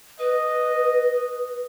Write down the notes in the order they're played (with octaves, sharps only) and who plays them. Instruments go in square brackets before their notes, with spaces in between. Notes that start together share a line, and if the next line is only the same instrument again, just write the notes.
[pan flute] B4 [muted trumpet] D#5